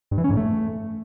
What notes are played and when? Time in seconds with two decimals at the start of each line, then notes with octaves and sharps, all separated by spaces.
0.11 G2
0.18 E3
0.24 C#4
0.31 G#2
0.37 A3